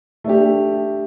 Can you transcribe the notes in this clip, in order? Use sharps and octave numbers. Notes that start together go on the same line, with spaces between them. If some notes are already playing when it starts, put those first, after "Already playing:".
A3 D4 G4